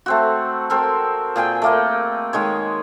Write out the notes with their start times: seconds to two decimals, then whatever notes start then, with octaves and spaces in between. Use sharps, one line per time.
0.06 A3 C4 F#4
0.70 C4 A4 A#4
1.36 A#2 G#4 G5 G#5
1.62 A3 A#3 D#5
2.33 D#3 G#3 C#5